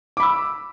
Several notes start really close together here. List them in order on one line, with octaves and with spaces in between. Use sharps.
D6 B5 E6